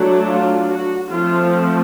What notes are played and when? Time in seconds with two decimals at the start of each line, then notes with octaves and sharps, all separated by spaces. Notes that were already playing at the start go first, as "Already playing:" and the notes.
Already playing: F#3 A3 D4
0.31 F4
0.71 F#4
1.11 F3 A3 C4 F4